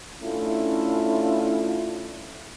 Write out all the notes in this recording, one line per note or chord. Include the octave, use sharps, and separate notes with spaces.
A3 C#4 D4 E4 F4